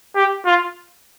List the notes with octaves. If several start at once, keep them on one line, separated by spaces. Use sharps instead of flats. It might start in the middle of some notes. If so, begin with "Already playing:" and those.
G4
F4